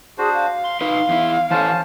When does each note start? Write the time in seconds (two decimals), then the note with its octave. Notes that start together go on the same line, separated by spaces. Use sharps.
0.18 D4 F#4 G#4 C5
0.34 F5
0.64 C6
0.81 D#4 B4 F5
1.09 E2 E4
1.51 E3 C#4 A4 C5 A5